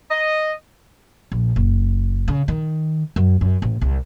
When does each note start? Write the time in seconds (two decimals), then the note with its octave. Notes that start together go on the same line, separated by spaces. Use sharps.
0.11 D#5
1.32 A#1
1.56 F#1
2.28 C#3
2.48 D#3
3.16 F#2
3.41 F#2
3.62 A1
3.81 C2